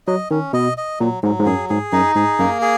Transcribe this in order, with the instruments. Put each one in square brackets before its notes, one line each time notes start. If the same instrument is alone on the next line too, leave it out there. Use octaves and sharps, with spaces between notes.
[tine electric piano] F#3 [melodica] D#5
[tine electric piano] D#3 [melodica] C#4
[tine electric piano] B2 [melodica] D#5
[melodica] D#5
[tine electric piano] A#2 [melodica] F#3
[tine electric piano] G#2 [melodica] F#3
[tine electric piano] G#2
[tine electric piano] F#2 [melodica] G#4
[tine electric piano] G#2 [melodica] G#4
[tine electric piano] F#2 [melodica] D#4
[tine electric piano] G#2 [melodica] G#4
[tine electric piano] F#2 [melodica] A#3
[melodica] G#4